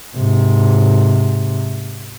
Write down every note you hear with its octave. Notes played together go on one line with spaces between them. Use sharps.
G#2 C3